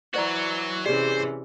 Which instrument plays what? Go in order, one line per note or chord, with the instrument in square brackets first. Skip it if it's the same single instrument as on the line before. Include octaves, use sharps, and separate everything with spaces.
[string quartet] E3 [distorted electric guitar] F#3 F#4 [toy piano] C5 D5 A#5
[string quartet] C3 E3 C#4 [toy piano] G4 D5 [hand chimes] G#4 [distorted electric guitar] C5